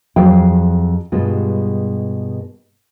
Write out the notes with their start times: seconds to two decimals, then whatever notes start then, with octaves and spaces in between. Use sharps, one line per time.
0.16 F2 F#3 G#4 F5 G5
1.12 G2 B2 G3 G#3 F4